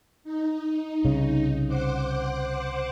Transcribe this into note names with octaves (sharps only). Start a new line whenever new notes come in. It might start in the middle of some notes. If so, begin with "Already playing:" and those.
D#4
C2 C#3
C5 F#5 D6